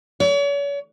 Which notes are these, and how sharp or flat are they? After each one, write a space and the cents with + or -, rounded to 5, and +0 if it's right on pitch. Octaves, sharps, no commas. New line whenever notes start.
C#5 +40